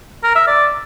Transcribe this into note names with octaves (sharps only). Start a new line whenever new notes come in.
A#4
E5
D5